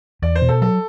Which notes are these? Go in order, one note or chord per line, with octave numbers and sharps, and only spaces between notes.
E2 D5
C5
B2
A4
F#3 A4